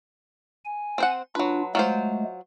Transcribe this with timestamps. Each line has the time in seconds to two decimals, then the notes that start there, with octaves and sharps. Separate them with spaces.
0.65 G#5
0.98 C4 C5 F#5
1.35 F#3 D4 F4 B4
1.75 F#3 G#3 A3 F4 C5